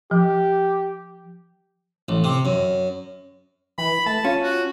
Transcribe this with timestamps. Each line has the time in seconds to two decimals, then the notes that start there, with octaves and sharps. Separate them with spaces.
0.11 F3 G4
2.09 A1
2.24 C3
2.45 F#2
3.78 E3 B5
4.06 A3 A5
4.24 C#4 F4
4.42 F#4